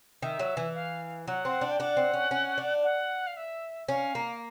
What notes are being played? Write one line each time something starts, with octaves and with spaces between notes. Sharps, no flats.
D#3 E5
F#3
E3
F5
F#3 F#5
C4
D4
G5
D4 F#5
C4
C#4
C#4
D4
F#5
F5
E5
C#4 F5
A#3